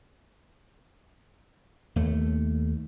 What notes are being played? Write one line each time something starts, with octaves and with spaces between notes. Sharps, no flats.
D#2 A3